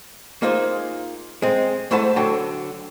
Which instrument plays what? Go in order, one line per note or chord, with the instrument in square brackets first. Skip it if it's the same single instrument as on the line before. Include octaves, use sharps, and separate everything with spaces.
[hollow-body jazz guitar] A#3 D#4 F4 G#4 C5
G#3 C4
G#2 A3 E4 C5 F#5 A5
D3 F#3 G5 A5